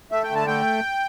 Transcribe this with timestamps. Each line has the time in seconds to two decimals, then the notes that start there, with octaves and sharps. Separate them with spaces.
0.12 A3 E5
0.23 G5
0.30 D3 A5
0.47 A3 G5